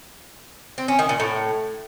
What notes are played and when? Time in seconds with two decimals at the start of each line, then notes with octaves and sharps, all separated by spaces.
0.78 C4
0.88 C#4
0.99 D#3
1.09 A#2
1.20 A2